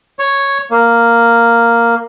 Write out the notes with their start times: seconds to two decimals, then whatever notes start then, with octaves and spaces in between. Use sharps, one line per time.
0.19 C#5
0.71 A#3